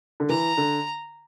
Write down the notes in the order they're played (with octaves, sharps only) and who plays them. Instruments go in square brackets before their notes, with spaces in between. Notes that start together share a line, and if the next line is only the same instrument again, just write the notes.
[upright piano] D3
[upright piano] E3 [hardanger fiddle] A#5
[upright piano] D3